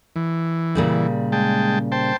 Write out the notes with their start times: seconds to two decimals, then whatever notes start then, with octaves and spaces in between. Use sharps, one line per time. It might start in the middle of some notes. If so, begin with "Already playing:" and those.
0.16 E3
0.75 A#2 C#3 G3
1.32 G#3 G5 A5
1.92 C5 G5 A5